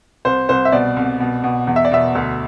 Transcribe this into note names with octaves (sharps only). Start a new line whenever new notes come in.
C2 C5
C2 C5
E5
B2 D5
C2
B2
B2
E2
E5
D5
B2 E5
D2